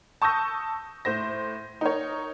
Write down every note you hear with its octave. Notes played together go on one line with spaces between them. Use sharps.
A5 C#6 D#6 E6 G6 A#6
A2 C5 A#6
D#4 A#4 C#5